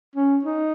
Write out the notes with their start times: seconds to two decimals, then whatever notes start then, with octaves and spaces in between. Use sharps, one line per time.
0.16 C#4
0.44 D#4